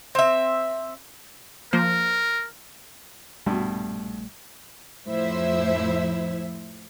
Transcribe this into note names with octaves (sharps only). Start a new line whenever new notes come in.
C4 E5
F3 A#3 A#4 C5
A#1 G2 B2 G3 A3
F2 A2 F3 E4 C5 E5